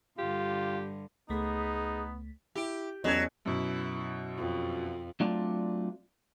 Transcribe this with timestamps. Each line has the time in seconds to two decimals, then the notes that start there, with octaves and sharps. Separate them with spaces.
0.18 G2 D3 F4 G4
1.30 C#2 A3 B3 D#4 G#4 B6
2.55 E4 G4 D7
3.04 E2 F#3 C#4 A4 D#5 G#6
3.46 F#2 B2 E4
4.37 F2
5.20 F#3 A3 C4 D4 F4 D5